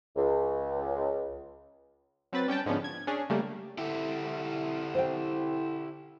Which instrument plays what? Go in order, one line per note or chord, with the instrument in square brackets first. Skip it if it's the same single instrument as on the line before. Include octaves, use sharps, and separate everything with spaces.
[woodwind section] C#2
[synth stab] F#3 C4 B4 A6
G3 C#4 G5 A5
G#2 D3 F3 B3 C#4
G#6
C#4 D4 G#4
C#3 G3 A3 A#3
[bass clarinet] D3 [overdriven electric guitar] E4 G4
[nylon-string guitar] C5 G5